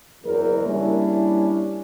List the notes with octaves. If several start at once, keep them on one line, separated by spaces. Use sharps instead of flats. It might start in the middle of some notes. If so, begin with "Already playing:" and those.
F#1 E2 A#4
G3 A#3 C#4 D4 E4